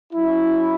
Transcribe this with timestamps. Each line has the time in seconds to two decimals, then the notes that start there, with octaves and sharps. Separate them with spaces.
0.13 F#3 C#4 E4